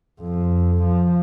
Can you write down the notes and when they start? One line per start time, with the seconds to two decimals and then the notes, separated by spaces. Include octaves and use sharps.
0.22 F2
0.84 F3